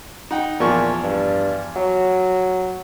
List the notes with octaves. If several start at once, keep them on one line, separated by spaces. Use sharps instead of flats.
D#4 F#5 G5
E2 A#2 F3 C#6
G2
F#3